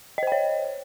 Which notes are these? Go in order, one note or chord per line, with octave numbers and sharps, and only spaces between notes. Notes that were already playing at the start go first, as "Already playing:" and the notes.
C5 C#5 D#5 G5